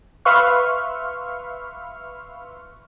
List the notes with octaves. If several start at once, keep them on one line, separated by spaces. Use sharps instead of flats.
B4 E5 F5 C6 C#6 F6